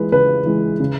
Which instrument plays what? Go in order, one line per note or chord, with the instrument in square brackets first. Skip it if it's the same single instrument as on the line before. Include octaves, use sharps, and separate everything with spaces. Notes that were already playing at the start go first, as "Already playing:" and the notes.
Already playing: [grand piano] E3 G#3 B4
C#3 B4
E3 G#3
C#3